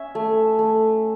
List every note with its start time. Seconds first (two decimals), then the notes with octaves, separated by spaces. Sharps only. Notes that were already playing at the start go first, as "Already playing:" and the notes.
Already playing: C#4 E5
0.15 A3
0.59 A3